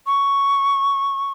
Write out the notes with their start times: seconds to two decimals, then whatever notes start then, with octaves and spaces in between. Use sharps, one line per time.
0.07 C#6